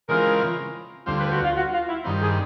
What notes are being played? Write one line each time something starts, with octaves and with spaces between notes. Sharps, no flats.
C#3 E3 G#3 C4 F4 A#4
D2 D3 G3 C4 F4 C5
B4
F#4
F4
F#4
F4
E4
G2 D#3 G3 C4 D#4
G#4